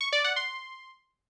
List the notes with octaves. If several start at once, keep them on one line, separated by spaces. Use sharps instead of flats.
C#6
D5
F#5
C6